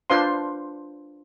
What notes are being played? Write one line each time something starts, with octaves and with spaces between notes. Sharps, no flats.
D4 F4 B4 C5 F5 C6